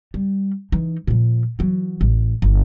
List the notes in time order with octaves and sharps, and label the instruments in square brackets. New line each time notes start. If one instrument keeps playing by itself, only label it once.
[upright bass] G3
E3 D#4
A#2 F3
E3 F#3
A1
G1